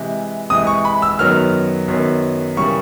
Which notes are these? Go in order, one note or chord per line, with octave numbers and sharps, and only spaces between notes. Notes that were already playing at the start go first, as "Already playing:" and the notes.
Already playing: C3 E3 G#3
C3 E3 G#3 D#6
C#6
B5
E6
F#2 D#3 F#3 B3 F6
F#2 D#3 F#3 B3
C#3 E3 G3 A#3 C#6